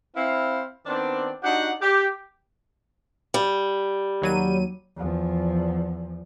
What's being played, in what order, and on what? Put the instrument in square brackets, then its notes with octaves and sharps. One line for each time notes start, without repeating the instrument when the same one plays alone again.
[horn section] C4 E4 F5
D#3 B3 C4 D4
D4 D#4 F#4 G4 F#5
G4
[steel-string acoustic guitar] G3
[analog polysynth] D#2 F#3 D#7
[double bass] E2 F3